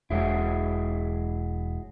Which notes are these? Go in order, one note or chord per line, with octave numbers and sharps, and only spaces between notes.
E1 F#3 G#3 E4